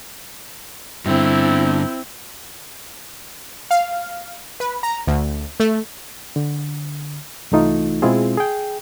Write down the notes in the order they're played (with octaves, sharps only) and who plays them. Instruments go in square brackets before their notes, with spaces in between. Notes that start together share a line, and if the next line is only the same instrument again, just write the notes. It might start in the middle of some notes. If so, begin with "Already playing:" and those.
[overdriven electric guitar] G2 D3 [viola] C4 E4
[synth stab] F5
B4
A#5
D2
A3
[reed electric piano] D3
C2 E3 A3 D#4 F4
B2 G#3 C4 E4 F4 G#4
G#4 G5